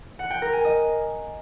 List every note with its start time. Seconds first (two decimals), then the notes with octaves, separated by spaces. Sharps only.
0.19 F#5
0.30 G5
0.42 A#4
0.53 G#5
0.65 D#5